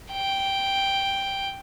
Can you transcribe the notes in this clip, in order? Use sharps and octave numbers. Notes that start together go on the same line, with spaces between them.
G5